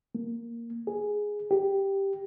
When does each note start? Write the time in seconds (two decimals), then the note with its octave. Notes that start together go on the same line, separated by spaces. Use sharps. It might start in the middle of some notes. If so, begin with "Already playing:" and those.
0.15 A#3
0.87 G#4
1.51 G4